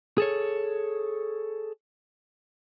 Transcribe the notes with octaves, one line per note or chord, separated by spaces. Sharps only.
G#4 A4 C#5